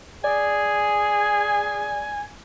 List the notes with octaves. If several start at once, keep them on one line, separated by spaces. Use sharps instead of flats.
G#4 D5 G#5